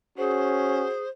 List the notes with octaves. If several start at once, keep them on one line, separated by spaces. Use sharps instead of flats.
C#4 F#4 G#4 C5